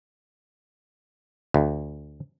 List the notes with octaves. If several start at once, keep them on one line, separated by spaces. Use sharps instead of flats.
D2